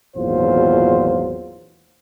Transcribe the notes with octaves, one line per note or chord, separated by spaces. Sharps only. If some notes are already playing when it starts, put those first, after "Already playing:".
G#1 E2 A#2 F#3 F4 C5